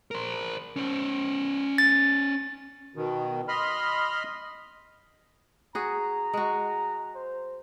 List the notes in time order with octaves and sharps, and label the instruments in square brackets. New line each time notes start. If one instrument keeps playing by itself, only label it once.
[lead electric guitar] A#4 C5
C#4 C5
[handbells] A6
[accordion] B2 D#3
D#5 B5 C6 F6
[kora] F#4 G#4 [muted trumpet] A#5
[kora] G#3 F#4
[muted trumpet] C5